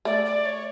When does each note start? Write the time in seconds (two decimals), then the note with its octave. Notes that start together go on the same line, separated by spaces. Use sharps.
0.05 A3 D5
0.25 D5
0.45 C#5